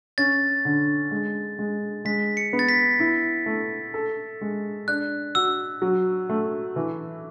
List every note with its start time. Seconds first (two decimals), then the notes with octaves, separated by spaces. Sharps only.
0.18 C#4 A6
0.65 D3
1.11 G#3
1.59 G#3
2.05 G#3 B6
2.37 C#7
2.53 B3
2.59 A6
2.69 B6
3.00 E4
3.46 A3
3.94 A4
4.41 G#3
4.88 D4 F#6
5.35 F#4 E6
5.82 F#3
6.29 A3
6.76 E3